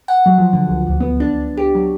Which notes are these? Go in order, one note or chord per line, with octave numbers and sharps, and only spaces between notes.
F#5
F#3
F3
D3
C#2
D2
B3
D4
G4
F#3